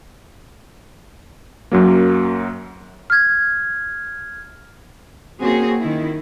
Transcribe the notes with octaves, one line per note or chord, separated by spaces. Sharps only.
F#2 F#3 A#3
F6 G#6
A#3 C4 C#4 F#4 G#4
D#3 E4